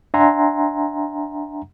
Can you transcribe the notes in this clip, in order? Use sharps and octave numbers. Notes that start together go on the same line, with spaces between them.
D4 E5 F#5 G#5 A#5 C6